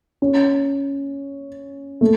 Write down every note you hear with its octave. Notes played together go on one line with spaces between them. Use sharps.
C#4
A3